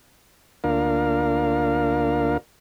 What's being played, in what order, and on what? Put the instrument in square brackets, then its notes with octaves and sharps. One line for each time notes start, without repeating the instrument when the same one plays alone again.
[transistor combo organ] D2 A#3 D4 F4 A#4 F5